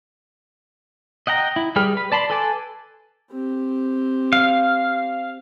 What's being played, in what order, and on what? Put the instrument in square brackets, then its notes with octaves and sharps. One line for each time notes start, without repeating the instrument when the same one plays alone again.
[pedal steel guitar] D#5 F#5 G5 A#5
E4
G3 G#4 B4 G5 F6
B4
D5 A5 B5 C6
A4 B4 G#5 A5 D6
[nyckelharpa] C4 G4
[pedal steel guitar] F5